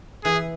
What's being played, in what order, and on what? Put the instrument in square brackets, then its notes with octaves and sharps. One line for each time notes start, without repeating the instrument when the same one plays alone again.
[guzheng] E3 [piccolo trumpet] G#4